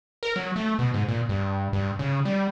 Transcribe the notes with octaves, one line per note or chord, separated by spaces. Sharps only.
A#4
F#3
A3
B2
G#2
A#2
G2
G2
C#3
G3